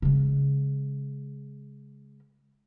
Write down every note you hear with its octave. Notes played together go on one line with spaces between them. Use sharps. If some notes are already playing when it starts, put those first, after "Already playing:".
C#3 G#3